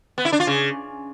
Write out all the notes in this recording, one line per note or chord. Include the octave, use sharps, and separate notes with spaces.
B3
E4
D4
F4
C#3